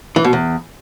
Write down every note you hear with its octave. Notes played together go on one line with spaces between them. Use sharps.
E3
B2
E2